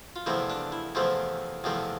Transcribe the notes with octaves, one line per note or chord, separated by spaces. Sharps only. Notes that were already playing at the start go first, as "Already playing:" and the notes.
F4
E2 C3 F3 A3 C4 E4
D4
E4
E2 C3 F3 A3 C4 E4
E2 C3 F3 A3 C4